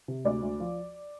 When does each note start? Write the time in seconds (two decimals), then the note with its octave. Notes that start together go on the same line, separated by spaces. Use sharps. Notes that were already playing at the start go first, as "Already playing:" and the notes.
0.08 C3
0.25 D2 D5
0.43 D2
0.60 F3